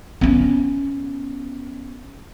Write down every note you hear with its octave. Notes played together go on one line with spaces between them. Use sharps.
B3 C#4